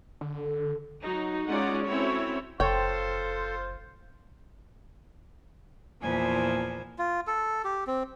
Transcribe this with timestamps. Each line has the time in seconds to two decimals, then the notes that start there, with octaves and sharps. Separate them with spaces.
0.21 D3
0.38 A4
1.02 F#3 D#4 F#4
1.48 G#3 C#4 D#4 F4 D5 F#5
1.85 C4 C#4 E4 F#4 A4 C#5
2.60 F#1 F4 A4 C5 C#5 G5
6.01 E2 A#2 E3 F3 C5 G#5
6.99 F4
7.27 A4
7.64 G4
7.87 C4